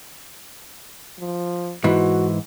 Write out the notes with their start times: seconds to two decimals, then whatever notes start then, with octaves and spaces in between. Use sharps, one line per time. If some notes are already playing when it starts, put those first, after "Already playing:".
1.19 F3
1.84 G#2 E3 F#4